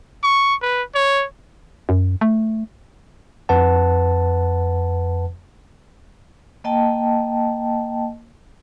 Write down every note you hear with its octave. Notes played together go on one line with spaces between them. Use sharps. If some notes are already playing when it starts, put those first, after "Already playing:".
C#6
B4
C#5
F#2
A3
F2 B4 F#5 A5
A#3 D#5 G5 A5